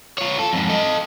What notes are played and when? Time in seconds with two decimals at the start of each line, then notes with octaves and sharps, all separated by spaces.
0.18 F4 C#5
0.39 A4
0.53 F2 G#2
0.69 A4 D#5